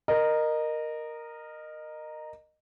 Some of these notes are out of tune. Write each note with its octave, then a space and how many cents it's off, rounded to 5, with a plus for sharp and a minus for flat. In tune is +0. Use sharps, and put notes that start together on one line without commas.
A#4 +0 D#5 -20